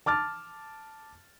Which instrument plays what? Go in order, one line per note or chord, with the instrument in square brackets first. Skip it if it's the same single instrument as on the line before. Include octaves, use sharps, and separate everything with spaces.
[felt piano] A5 D6 F6 A6